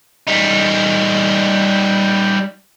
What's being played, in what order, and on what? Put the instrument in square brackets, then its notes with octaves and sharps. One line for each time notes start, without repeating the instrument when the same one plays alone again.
[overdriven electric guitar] G3 D#4